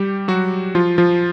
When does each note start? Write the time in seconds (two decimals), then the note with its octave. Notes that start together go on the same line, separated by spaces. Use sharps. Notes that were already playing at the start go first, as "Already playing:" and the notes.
Already playing: G3 G4
0.28 F#3 F#4
0.75 F3 F4
0.98 F3 F4